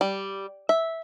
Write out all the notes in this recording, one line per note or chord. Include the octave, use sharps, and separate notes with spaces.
G3
E5